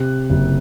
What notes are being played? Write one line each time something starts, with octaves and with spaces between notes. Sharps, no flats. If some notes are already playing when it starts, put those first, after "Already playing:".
Already playing: C3 F#6
F#1